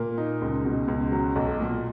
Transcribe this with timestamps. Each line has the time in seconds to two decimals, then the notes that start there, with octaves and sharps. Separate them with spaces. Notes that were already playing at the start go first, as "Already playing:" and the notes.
Already playing: A#2 A#3
0.18 D#4
0.42 C#2
0.65 B2
0.88 C#2
1.12 F#3
1.36 B1
1.60 A#2